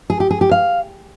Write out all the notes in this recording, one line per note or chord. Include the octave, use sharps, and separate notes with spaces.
G#4
G4
G#4
G4
F5